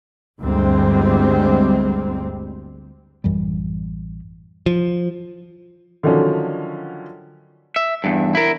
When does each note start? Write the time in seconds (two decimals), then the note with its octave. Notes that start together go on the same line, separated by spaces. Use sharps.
0.40 G1 D2 G3 G#3 C4
3.24 A1 F#2 E3 G3
4.66 F3
6.03 D3 D#3 F3 F#3 C#4 D4
7.76 E5
8.04 E2 G2
8.35 E4 A#4